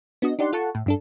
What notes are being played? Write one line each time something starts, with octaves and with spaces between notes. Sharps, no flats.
B3 D4 F#4 D#5
D4 D#4 G4 D5 F#5 C6
F4 A4 F#5 A5 C#6
A2
G2 D4 A4